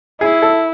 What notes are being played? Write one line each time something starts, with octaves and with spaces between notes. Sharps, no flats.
E4 G#4
A4